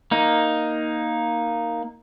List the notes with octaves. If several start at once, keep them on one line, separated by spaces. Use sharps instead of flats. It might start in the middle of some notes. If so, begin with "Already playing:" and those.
A#3 D#4